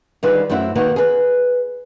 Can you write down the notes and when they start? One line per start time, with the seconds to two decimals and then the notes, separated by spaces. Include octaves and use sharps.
0.23 D3 D#3 G3 F4 G#4 B4
0.50 F#2 A3 C4 E4 F#4
0.76 D#3 A#3 D#4 F#4 B4
0.96 G#4 B4